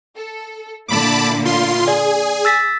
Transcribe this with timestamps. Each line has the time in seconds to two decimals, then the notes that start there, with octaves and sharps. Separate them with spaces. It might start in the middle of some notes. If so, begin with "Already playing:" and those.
0.17 A4
0.88 A#2 D3 E4 A5 B5 D6
1.45 F4 C6
1.88 G#4 D5 G#5
2.45 E6 A6 B6